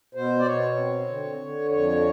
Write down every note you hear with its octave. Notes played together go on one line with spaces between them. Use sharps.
B2 C5
D5
B2 C#5
C4
D3
D3
F2 C#5